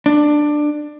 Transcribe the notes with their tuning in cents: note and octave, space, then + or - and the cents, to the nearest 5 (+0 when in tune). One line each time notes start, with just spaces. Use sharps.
D4 +15